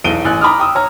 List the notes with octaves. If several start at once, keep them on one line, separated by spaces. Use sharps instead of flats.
B1 E2 D7 D#7 G7
A1 G#5 F#6
A#5 B5 D6 D#6 F6
G5 D#6 E6
C#5 A#5 F6